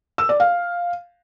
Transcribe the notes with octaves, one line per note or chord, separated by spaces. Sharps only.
E6
D5
F5